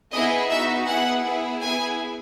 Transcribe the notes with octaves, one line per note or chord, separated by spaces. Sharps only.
B3 E4 G#4 D#5
B3 D#4 F#4 E5
B3 E4 G#4 F#5
B3 E4 G#4
B3 E4 G#4 G#5